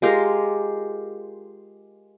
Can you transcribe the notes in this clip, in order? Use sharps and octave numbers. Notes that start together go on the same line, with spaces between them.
G#3 F4 G4 A#4